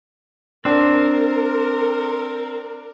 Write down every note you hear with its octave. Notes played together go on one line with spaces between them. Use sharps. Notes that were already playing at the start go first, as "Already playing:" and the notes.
C4 D4 A#4